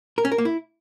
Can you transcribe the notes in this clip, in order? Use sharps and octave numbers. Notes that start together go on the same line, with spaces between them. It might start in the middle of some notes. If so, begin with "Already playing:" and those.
A#4
C#4
A#4
A#3
E4